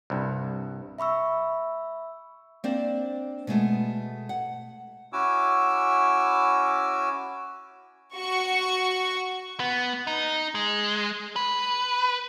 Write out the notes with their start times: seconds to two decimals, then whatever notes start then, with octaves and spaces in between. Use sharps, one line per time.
0.10 C2 G2
0.98 E5 B5 C#6 E6
2.64 A#3 C4 D4 C5 D5
3.47 B2 G#3 A3 B3
4.29 F#5
5.13 C#4 E4 F#4 G#5 D6 E6
8.16 F#4 C#6
9.60 B3
10.07 D#4
10.55 G#3
11.36 B4